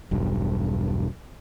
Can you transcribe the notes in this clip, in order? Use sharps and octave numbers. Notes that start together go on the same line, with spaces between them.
E1 B1 G2